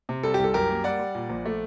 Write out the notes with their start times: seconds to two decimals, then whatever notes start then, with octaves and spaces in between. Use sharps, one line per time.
0.09 C3
0.23 G3 A4
0.34 G4
0.39 C2
0.44 A4
0.54 F#2 G4 A#4
0.70 A#3
0.84 G3 D5 F#5
0.99 G3
1.15 A#2
1.30 A#1
1.46 A3